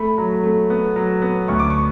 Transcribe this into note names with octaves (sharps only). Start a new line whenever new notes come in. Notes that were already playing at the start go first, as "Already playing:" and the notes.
Already playing: A3 B5
F#3
A3
B3
F#3
B3
D2 C#6
D6
C#6